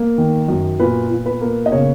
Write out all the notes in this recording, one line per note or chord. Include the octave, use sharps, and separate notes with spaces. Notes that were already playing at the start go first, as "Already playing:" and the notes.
Already playing: A#3
D#3
F#2
A#2 B4
A#2
B4
A#3
D#5
C#3 C#5